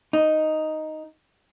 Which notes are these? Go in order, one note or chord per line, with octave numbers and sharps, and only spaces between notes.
D#4